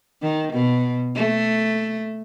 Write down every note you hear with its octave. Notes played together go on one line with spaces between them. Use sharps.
D#3
B2
A3